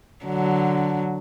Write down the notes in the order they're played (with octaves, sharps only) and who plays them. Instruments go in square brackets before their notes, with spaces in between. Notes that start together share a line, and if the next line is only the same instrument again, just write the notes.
[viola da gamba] D3 F#3